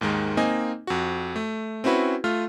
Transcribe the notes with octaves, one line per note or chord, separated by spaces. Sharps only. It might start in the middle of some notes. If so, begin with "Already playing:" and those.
D#2 G#2 D#3 G#3
A#3 C4 D#4 D#5 G#5
F2 F#4
A3
C4 C#4 E4 F#4 B4
A3 F4 F6